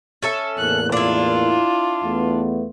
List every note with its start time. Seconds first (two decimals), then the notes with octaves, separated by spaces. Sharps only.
0.22 C#4 A4 E5
0.58 E2 A2 A#3 F#6
0.92 D4 E4 F4
2.04 E2 A3 B3